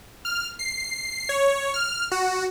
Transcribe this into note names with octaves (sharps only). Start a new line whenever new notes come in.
F6
C7
C#5
F6
F#4